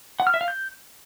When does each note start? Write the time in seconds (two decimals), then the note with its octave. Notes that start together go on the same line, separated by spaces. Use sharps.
0.20 F#5
0.27 F6
0.34 E5
0.41 F5
0.48 G6